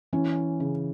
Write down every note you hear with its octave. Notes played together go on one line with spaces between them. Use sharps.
E3 C#4
C#3